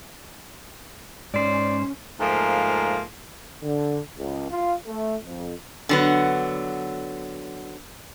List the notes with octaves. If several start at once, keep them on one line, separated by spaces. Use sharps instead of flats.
G#2 C#4 C5 D5
G#2 F3 A3 A#3 F5
D3
C#2
F4
A3
F2
D3 F#3 B3